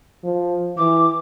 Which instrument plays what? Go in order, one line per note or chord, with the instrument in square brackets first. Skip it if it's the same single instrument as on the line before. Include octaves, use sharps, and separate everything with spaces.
[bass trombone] F3
[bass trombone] E3 [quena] D6